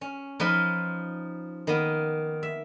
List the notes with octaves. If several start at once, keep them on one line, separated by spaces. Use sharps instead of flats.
C#4
F3 D#4 B4 D#5
D#3 A#3 B3 D#5
E5